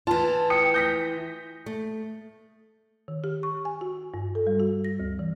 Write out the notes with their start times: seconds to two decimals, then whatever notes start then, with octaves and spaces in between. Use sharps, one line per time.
0.07 E3 F4 A5
0.50 G5 D#6 C#7
0.74 G6 A#6 B6
1.66 A3
3.08 D#3
3.24 G4
3.43 C#6
3.65 G#5
3.81 F#4
4.14 G2
4.35 A4
4.47 G3
4.60 F#4
4.85 A#6
5.00 D2
5.19 E3